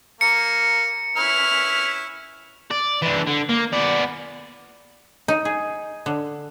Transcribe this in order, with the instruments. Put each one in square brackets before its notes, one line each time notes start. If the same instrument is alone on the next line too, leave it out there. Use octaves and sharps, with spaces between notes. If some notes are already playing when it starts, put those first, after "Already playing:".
[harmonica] A#3 [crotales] C#7
[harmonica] C#4 E4 B4 [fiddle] F6
[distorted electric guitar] D5
E3 D4
D3
A#3
B3 D5
[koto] D#4
G#4
D3